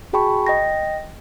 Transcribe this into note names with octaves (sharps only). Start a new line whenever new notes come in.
F#4 G#4 G5 A5 B5 C#6
D#5 G5 A#6